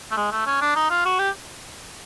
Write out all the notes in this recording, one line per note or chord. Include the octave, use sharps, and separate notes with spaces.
A3
G#3
A3
C#4
D4
D#4
F4
F#4
G4